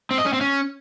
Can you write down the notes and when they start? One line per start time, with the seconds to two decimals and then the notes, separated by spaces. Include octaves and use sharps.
0.11 C4
0.18 D#5
0.26 C#4
0.33 C4
0.41 C#4